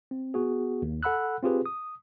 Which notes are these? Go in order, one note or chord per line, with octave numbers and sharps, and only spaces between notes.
C4
B3 F#4 G#4
D#2
A4 F#5 B5 E6 F#6
C4 F4 G4 G#4 B4
D#6